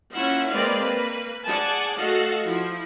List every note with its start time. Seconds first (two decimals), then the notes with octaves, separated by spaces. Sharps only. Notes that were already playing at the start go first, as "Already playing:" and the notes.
0.12 A#3 C#4 E4 F4 E5 F#5
0.49 G#3 A#3 C4 B4 D5 F5
0.80 A#3 B4
1.44 G#4 D5 F#5 G#5 A5
1.96 A3 F#4 A4 D#5 F5 F#5
2.45 F3 E4